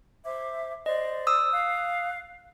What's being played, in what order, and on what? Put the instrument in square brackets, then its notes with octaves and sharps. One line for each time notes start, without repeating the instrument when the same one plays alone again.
[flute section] C5 E5 D6
[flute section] C5 D5 [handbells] D#5
[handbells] D#6 E6
[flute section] F5 F#6